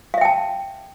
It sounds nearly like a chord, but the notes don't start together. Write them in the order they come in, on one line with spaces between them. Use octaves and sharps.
F5 E5 G5 A5